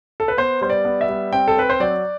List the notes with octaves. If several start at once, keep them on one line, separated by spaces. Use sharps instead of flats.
A4
B4
B3 C5
G3 C5
D5
B3
E5
G3
C4 G5
A4
C4 B4
C5
F#3 D5